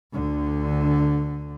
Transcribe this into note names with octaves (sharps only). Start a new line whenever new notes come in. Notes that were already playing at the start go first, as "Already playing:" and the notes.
D2 D3